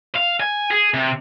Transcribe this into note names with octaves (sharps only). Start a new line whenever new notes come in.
F5
G#5
G#4
C3